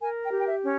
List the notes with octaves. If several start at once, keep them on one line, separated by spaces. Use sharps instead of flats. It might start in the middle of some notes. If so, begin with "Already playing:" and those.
A#4 G#5
G5
G4
G5
E5
C#4